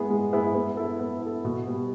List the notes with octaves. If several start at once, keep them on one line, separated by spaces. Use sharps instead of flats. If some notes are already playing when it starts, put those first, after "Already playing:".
Already playing: G#3 B3 E4 G#4
G#3
B3 E4 G#4
B3
E4 A4
B3
E4 A4
B2
G3 B3